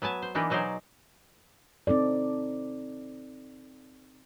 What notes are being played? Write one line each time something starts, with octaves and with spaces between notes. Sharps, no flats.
F#3 B3 G#5 A5
C5
E3 A#3 B3 D4 D#4
B2 F#3 D#4 G#4 C5 D5
C4 D#4 A4 D5